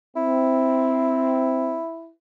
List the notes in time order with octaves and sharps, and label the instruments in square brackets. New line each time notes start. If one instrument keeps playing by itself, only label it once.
[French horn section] C4 [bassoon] E4